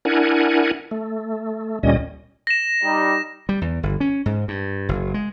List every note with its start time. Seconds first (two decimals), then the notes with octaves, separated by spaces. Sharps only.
0.05 D4 E4 A#4 F#5 G#5
0.91 A3
1.83 D2 A#2 G3 C#4 D#5
2.47 A#6 E7
2.83 G3 D#4
3.49 G3
3.61 E2
3.83 G1
4.00 C#4
4.26 G#2
4.48 G2
4.89 F#1
5.14 G#3